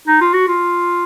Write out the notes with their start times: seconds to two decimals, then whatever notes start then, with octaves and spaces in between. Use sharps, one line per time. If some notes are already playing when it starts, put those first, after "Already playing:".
0.07 D#4
0.21 F4
0.33 F#4
0.48 F4